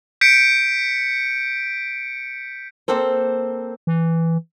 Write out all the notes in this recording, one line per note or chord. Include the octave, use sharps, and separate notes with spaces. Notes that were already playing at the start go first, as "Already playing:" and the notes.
G6 B6 C#7 D7
A#3 C4 A4 C5
E3